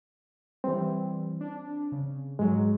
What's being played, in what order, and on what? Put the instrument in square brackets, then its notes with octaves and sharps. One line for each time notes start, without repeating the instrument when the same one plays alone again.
[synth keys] E3 G3 [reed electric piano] C4
[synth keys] D4
C#3
[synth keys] G#2 F#3 [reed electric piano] G#3